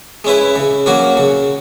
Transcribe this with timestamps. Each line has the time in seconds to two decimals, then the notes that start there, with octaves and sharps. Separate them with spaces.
0.24 G#3 C#4 E4 B4
0.56 C#3
0.86 F#3 A#3 C#4 F#4
1.17 C#3